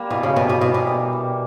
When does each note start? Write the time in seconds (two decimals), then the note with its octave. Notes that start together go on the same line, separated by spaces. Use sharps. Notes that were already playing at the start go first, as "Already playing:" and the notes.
Already playing: G3 A#3
0.10 B2 E3
0.23 C#3
0.36 B2 G3 A#3
0.49 B2
0.61 B2 E3
0.74 B2
0.87 G3 A#3
1.13 E3